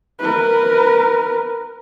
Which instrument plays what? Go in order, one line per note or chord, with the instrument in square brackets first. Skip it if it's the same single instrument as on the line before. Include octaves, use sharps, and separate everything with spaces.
[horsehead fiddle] A#4 B4